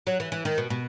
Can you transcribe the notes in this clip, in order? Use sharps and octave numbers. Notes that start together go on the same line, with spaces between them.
F#3
E3
E3
D#3
B2
B2